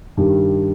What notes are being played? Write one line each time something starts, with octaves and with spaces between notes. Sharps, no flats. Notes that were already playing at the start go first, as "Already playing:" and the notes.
G2 D#3 G3